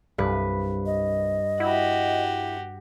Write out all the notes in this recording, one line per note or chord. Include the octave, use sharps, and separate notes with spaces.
C2 G2 B4
D#5
E4 F#4 G4